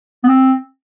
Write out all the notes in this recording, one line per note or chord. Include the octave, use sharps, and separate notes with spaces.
B3
C4